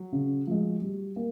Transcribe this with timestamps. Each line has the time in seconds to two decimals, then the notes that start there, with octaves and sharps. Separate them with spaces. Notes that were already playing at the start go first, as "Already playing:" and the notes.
Already playing: F#3
0.12 C#3
0.47 F3 G#3
0.82 G3
1.16 A#3